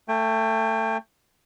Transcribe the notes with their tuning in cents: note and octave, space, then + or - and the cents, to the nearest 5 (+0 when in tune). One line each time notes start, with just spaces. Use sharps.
A3 +20 G5 +35